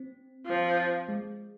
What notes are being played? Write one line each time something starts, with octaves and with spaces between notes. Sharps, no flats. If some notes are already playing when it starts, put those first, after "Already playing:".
Already playing: C4
F3
G#3